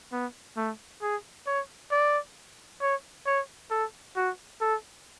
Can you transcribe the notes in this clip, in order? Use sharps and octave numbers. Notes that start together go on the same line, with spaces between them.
B3
A3
G#4
C#5
D5
C#5
C#5
A4
F#4
A4